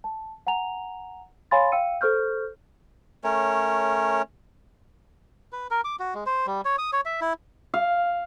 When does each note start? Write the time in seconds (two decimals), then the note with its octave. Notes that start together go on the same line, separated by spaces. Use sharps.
0.04 A5
0.47 F#5 G#5 A#5 F7
1.51 C#5 F5 G#5 B5 C6 A6
1.72 F5 G5 E6 C#7 D#7
2.01 A4 C5 C#6 F6 G6
3.24 A3 C#4 A#4 C#5
5.53 B4
5.71 A#4
5.84 D6
6.00 F#4
6.14 G#3
6.26 C5
6.47 G3
6.65 C#5
6.78 D#6
6.93 C#5
7.06 E5
7.21 E4
7.74 F5